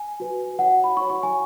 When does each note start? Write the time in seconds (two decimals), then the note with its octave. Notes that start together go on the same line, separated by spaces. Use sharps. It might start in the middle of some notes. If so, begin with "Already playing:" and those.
Already playing: G#5
0.20 F#4 B4
0.59 F#4 C#5 F#5
0.84 B5
0.97 F#4 C#5 C#6
1.10 C#6
1.23 G#5